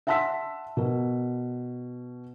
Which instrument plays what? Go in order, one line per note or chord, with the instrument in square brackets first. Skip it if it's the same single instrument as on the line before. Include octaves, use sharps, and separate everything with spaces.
[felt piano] E5 F#5 A5 C6 E6 B6
B2 A#4